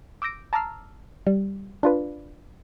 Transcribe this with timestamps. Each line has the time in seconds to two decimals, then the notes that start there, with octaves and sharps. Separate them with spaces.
0.22 D6 E6 G6 A#6 D7
0.53 A5 A#5 D6 E6 F6 C7
1.27 G3
1.83 D4 F4 B4